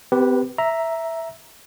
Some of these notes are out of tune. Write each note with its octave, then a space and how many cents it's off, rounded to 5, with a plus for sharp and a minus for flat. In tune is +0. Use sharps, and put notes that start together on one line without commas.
C4 -45 G4 +0 B4 -15
E5 +0 A#5 +0